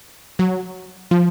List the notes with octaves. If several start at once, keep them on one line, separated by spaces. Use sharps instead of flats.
F#3
F3